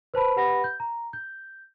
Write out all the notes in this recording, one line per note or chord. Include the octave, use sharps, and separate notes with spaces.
B4 C5 A5 B5
G4 B4 F#5 B5 A#6
G6
A#5
G6